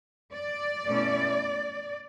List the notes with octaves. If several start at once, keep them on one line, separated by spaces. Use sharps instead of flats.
D5
B2 A3 C#4 E4